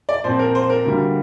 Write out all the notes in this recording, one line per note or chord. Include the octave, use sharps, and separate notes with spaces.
D5
A#2 F3 C4 C5
A#4
C5
A#4
D2 D3 G3 A#3